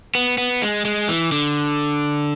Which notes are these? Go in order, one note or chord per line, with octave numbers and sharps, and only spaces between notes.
B3
B3
G#3
G#3
E3
D3